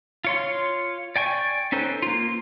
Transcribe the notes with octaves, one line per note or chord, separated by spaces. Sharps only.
F4 C#5 C6
D5 G5 G#5 C#6
C#4 D#4 A4 B4 C5
A#3 F4